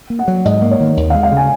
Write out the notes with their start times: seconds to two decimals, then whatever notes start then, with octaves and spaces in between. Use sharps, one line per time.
0.10 A#3
0.19 F#5
0.28 F#3
0.45 G#2 D#5
0.62 A#3
0.71 C#5
0.80 D#3
0.97 D#2
1.10 F5
1.15 G#3
1.23 F5
1.31 C#3
1.37 G#5